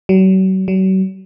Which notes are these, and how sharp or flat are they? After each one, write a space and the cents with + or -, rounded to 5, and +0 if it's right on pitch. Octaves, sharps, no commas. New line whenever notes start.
F#3 +40
F#3 +40